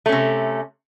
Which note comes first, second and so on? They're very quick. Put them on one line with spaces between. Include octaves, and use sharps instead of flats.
A3 C#4 C3